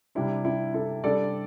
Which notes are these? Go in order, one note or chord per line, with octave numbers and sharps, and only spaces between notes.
C3 G3 D4 E4
E4
E4 A4
C3 G3 D4 A4 D5